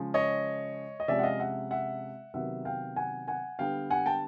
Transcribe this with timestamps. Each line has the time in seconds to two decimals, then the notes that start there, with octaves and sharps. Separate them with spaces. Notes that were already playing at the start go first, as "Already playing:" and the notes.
Already playing: C#3 F3 G#3
0.14 C#5 D#5
1.00 D#5
1.08 C3 F3 G#3 C#4 D5 E5
1.19 F#5
1.23 D#5 F5
1.39 E5 F#5
1.71 E5 F#5
2.34 C3 D#3 F#3 B3 E5 F#5
2.65 F5 G5
2.96 F#5 G#5
3.28 F#5 G#5
3.59 D3 G3 B3 F5 G5
3.90 F#5 G#5
4.06 G5 A5